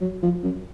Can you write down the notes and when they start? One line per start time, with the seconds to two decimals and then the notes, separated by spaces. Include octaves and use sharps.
0.01 F#3
0.23 F3
0.43 F#2